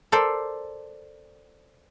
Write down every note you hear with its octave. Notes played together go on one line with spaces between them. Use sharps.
A4 A#4 C5 D5